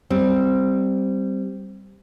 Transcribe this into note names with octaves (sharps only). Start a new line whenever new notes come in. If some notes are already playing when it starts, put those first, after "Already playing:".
G3 C4